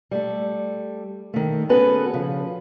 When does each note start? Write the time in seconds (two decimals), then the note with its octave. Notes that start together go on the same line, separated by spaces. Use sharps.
0.11 G3 A3 A4
1.34 D#3 A3
1.69 B3 C#4 F#4 G#4 A4 B4
2.14 C#3 F3